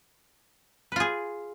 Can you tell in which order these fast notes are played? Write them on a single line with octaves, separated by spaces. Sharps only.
B4 F4 G#4